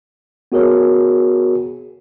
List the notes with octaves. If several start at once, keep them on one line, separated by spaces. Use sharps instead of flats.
B3 F#4 G#4 A#4 C#5